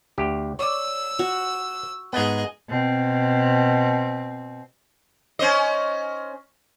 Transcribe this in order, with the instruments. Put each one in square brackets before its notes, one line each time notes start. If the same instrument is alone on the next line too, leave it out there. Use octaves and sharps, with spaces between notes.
[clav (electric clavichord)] D2 G4
[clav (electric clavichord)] C#5 D5 [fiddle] E6
[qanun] F#4
[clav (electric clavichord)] G#2 B3 [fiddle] G#4 D#5
[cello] B2 C4
[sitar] C#4 C5 D#5